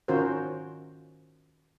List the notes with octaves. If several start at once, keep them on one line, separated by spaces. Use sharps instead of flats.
D#3 C#4 F4 F#4 A#4 C5